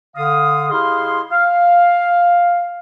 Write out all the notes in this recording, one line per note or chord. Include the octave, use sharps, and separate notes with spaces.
D3 F5 D#6
E4 G4 G#4 D#5 F5 C6
F5